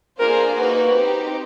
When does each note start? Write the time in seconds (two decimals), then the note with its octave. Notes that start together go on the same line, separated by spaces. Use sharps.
0.20 A#3 D4 F4 G#4 A#4 C5
0.57 A#3 D#4 F#4 B4
0.95 C4 D#4 G4